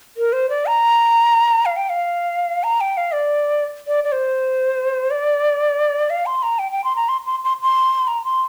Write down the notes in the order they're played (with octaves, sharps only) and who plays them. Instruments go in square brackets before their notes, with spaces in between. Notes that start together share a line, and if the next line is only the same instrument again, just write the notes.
[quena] A#4
C5
D5
A#5
F5
G5
F5
A#5
G5
F5
D5
D5
D5
C5
D5
F5
C6
A#5
G5
G5
C6
A#5
C6
C6
C6
C6
A#5
C6